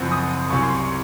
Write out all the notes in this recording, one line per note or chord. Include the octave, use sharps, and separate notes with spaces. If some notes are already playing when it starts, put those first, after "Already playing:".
Already playing: F#1 F#2 F3 C4 F#5
D#6
C2 C3 F#3 C#4 C#6
C6
C#6